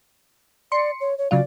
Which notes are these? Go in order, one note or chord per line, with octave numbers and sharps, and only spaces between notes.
D5 C6 C#7
C#5
C#5
C#3 F#3 F4 D5